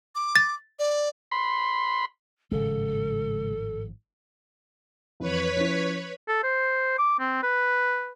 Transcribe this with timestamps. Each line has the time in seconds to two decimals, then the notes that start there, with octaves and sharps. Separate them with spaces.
0.15 D6
0.36 A6
0.79 D5
1.31 B5 C6
2.51 G#1 A2 C#3 F3 G#3 A4
5.20 F2 E3 B4 C#5 B5
5.56 F3 C#4 E4
6.28 A4
6.44 C5
6.99 D6
7.20 C4
7.43 B4